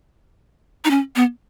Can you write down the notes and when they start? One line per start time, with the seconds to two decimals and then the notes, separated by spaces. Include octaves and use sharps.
0.85 D#4
0.91 C#4
1.16 B3